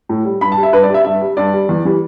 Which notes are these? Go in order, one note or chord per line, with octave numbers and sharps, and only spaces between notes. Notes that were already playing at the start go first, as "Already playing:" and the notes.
A2
G3
G2 B5
A5
G3
E5
G2 B4
D5
G3
E5
G2 E5
G3
G2 D5
G3
E2
E3 G3